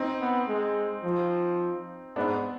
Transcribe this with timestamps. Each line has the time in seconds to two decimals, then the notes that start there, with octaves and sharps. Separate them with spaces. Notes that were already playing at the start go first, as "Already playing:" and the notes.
Already playing: C4 D#4
0.20 B3
0.48 G#3
1.03 F3
2.16 G#2 B3 D4